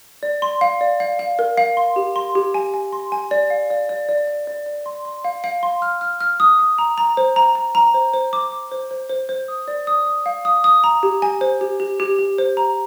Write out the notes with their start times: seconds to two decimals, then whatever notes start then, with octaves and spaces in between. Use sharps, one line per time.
0.23 D5
0.42 C6
0.61 F5
0.81 D5
1.00 F5
1.19 F5
1.39 A#4
1.57 F5
1.77 C6
1.96 G4
2.16 C6
2.35 G4
2.54 G#5
2.74 G#5
2.93 C6
3.12 G#5
3.31 D5
3.50 F5
3.70 D5
3.89 D5
4.09 D5
4.28 D5
4.47 D5
4.66 D5
4.86 C6
5.05 C6
5.25 F5
5.44 F5
5.63 C6
5.82 F6
6.01 F6
6.21 F6
6.40 D#6
6.59 D#6
6.78 A#5
6.98 A#5
7.17 C5
7.36 A#5
7.55 A#5
7.75 A#5
7.94 C5
8.14 C5
8.33 D6
8.52 D6
8.71 C5
8.91 C5
9.09 C5
9.29 C5
9.48 D#6
9.68 D5
9.87 D#6
10.06 D#6
10.26 F5
10.45 D#6
10.64 D#6
10.84 A#5
11.03 G4
11.22 G#5
11.41 C5
11.61 G4
11.80 G4
12.00 G4
12.19 G4
12.38 C5
12.57 A#5